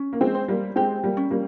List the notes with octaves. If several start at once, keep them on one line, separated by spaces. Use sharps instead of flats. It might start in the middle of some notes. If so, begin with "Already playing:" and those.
Already playing: C#4
A#3
G#3 C4
C5
G3 A#3
G#3 C4 G4
G3 A#3
C#4
G3 A#3